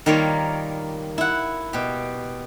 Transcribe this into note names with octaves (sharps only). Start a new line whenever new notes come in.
D#3 G3 A#3 F4 C#5
E4 F#5
B2 G4